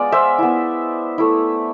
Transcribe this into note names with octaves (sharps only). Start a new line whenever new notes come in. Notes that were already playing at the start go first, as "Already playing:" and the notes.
Already playing: G#3 B3 F4 D5
C5 E5
B3 E4
A3 E4